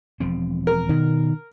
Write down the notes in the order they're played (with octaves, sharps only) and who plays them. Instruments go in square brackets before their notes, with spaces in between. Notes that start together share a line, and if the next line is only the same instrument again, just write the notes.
[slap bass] E1 F3 C4
[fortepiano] A#4
[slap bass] B2 [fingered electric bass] D#3